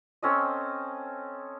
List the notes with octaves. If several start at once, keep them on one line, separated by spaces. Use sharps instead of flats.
C4 C#4 A4 D#5